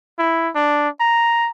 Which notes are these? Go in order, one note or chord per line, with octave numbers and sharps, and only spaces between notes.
E4
D4
A#5